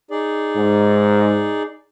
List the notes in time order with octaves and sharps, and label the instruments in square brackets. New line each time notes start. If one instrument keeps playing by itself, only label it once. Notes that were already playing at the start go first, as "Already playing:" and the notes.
[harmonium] D#4 G#4 D5
[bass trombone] G#2